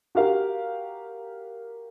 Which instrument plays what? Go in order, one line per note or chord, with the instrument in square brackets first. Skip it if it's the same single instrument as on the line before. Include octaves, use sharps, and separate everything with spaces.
[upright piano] F#4 G4 A#4 F5